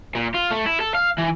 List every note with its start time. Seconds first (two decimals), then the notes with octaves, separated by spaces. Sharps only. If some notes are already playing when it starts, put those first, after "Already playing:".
0.15 A#2
0.34 F4
0.50 A3
0.66 E4
0.80 A4
0.95 F5
1.18 E3